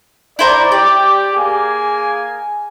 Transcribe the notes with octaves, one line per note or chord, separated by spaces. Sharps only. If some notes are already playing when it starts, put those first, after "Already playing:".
E4 C5 D5 A#5
G4 D5
A#3 G#4 G#5